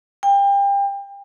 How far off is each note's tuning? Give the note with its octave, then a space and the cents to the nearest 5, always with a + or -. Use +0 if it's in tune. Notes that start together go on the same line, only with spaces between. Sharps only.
G5 +30